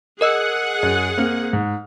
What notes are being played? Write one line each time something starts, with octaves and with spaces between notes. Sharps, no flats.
G#4 A#4 D#5 F#5 E6
F#2
A#3 C4 F6
G#2